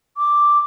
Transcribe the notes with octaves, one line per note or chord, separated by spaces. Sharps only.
D6